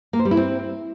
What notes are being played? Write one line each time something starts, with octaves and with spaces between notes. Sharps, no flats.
A#3
C5
G3
E4
C4